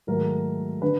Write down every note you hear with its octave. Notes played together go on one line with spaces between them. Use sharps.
G#2 D#3 F#3 A3 A#4
D3 B4